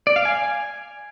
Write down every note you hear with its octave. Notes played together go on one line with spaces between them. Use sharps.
D5
F5
G#5